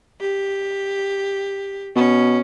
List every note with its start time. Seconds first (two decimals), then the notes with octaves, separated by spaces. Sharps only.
0.20 G4
1.96 B2 C#4